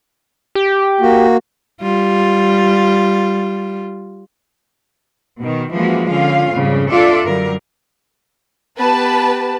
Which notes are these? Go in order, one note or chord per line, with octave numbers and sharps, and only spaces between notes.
G4
A#3 F#4
G3 F4
B2 D#3
E3 F3 G#3 A#3 C#4 F#4
D3 C#4 F4 F5
F2 G#2 C#3 G3
D4 F4 A4 D5 E5
F#2 D3 G3 A#4
B3 G4 B4 A5